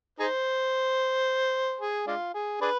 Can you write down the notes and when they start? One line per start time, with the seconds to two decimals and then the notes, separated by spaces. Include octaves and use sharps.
0.19 D#4 G#4 C5
1.81 G#4
2.07 G#3 D4 F4
2.34 G#4
2.61 D4 G#4 B4